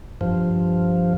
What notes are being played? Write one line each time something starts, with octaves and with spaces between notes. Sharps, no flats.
G2 F3